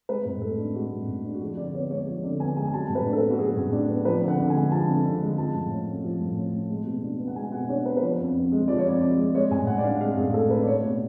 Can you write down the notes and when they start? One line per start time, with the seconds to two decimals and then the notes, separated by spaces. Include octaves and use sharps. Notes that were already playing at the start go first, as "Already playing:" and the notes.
0.09 G#3 B4
0.25 A2
0.41 A2 A4
0.58 D4
0.74 G#3 F#4
0.92 A2
1.07 A2
1.25 D4
1.34 F#4
1.41 F3 G#4
1.57 D3 D5
1.74 B3 C#5
1.91 G#3 C#5
2.08 F3
2.24 D3 D5
2.40 B3 G#5
2.56 G#3 G#5
2.67 G#5
2.73 F#3 A5
2.89 A2
2.95 B4
3.06 D4
3.13 A4
3.18 B4
3.23 B3
3.31 F#4
3.39 F#3 G#4
3.56 A2
3.73 D4
3.89 B3
4.05 F3 B4
4.22 D3
4.28 F#5
4.39 D3
4.50 G#5
4.55 G#3
4.72 F3 A5
4.88 D3
5.05 D3
5.21 G#3
5.38 F3 A5
5.55 A2
5.71 C#4
5.87 A3
6.04 F3
6.20 A2
6.37 C#4
6.54 A3
6.70 G#3
6.87 B2
7.03 D4
7.19 B3
7.28 F#5
7.36 G#3 G#5
7.52 B2 F#5
7.69 D4 C#5
7.86 B3 B4
7.97 B4
8.02 F3 C#5
8.19 F2
8.36 F2
8.52 G#3
8.68 F3 D5
8.78 C#5
8.85 F2 D5
9.01 F2 D5
9.18 G#3
9.34 G#3 C#5
9.51 A2 G#5
9.67 A2 F#5
9.78 D5
9.84 D4 F5
10.01 G#3 F5
10.17 A2 G#4
10.34 A2 A4
10.50 D4 B4
10.61 D5
10.67 A3 C#5
10.83 B2